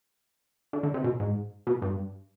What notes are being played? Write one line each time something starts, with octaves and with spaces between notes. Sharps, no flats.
D3
D3
C3
B2
G#2
B2
G2